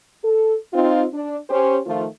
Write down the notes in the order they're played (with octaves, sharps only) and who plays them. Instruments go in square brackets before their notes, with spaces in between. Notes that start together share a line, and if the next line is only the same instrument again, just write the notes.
[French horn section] A4
C4 D#4 F4
D4
C#4 G4 C5
D#3 F3 A3 F4